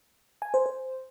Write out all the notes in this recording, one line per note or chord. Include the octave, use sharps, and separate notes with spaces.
G#5
C5
C5